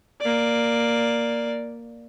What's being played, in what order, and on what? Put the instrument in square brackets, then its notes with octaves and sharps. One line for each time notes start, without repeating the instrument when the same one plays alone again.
[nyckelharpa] A#3 D5